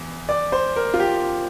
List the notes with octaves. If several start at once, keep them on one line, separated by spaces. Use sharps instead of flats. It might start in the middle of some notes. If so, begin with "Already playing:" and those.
Already playing: E2
D5
C5
A#4
F4
G4